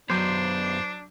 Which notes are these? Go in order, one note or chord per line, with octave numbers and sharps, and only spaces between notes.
F#2 F#3 B3 D4 C5 D6 G6